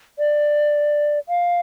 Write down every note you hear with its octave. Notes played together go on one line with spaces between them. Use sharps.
D5
F5